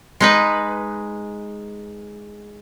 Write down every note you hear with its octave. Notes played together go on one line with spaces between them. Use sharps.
G#3 D#4 B4